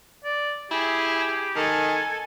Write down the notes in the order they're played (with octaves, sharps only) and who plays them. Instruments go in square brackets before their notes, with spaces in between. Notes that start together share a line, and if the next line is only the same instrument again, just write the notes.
[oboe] D5
[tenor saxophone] E4 [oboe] G4 [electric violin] G#4
[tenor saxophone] D#3 [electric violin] A4 G#5